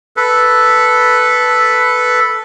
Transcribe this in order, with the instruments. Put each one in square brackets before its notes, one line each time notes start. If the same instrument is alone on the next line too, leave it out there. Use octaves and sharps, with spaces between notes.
[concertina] A4 B4